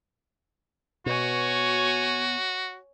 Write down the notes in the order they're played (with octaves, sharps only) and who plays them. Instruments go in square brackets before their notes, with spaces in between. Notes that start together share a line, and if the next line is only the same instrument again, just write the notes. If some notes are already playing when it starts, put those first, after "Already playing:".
[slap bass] B2 [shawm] F#4 [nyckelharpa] C#5 G#5